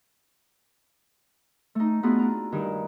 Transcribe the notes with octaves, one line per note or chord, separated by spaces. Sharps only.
A3 D#4
A3 B3 D4 F4 F#4 G#4
D4 A#5
G2 D#3